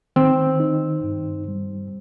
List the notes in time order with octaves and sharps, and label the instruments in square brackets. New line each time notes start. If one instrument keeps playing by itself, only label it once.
[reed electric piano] D#3 [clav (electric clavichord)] C4
[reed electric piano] D#4
G2
G3